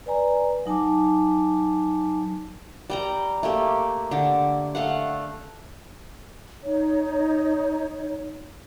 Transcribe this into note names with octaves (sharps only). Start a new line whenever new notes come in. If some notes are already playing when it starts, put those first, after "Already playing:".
B4 D5 G#5 A#5
F#3 D#4 G#5 A5 D6
G3 G5 A#5
A3 A#3 G4
D3 G4
A3 F5 F#5
D#4 C#5